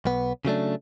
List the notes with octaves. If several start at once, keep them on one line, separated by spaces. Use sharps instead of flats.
B1 B3
C#3 F#3 A3 D4